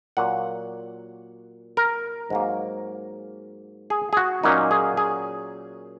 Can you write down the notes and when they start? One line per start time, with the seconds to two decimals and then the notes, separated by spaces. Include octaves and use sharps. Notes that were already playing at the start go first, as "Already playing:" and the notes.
0.17 A#2 F#3 A#3 F#5
1.77 A#4
2.30 G#2 F#3 A#3
3.90 G#4
4.13 G#4
4.17 F#4
4.43 A#2 F#3 A#3 C#4 D#4
4.71 G#4
4.97 G#4